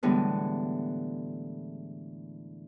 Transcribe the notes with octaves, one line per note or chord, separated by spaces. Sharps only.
A2 D3 E3 G3 G#3 B3